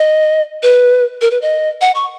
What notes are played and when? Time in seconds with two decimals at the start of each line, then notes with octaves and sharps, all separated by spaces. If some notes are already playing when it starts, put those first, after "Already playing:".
Already playing: D#5
0.63 B4
1.21 A#4
1.31 B4
1.42 D#5
1.81 F#5
1.95 C#6